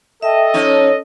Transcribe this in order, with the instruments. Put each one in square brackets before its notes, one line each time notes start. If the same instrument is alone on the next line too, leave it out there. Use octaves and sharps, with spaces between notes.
[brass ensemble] A4 D#5 [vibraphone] E5 G5
[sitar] F3 D#4 C#5 [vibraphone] C#4